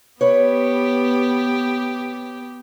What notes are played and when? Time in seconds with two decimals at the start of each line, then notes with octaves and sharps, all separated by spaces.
0.21 B3 G4 B4 C#5